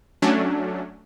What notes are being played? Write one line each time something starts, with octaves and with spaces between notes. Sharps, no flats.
F#3 A3 C#4 D4